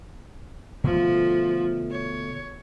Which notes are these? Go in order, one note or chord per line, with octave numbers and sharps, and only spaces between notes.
B2 D3 F3 A3
C#5